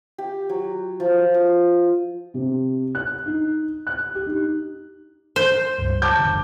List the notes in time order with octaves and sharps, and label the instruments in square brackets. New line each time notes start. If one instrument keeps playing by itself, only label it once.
[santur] G4
F#3
F3
D#6
[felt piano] C3
F#6
D#4
F#6
G4
D#4
[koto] C5
[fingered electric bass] C#2 G2
[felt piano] A5 D6 G6
[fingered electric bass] G1 E2 D3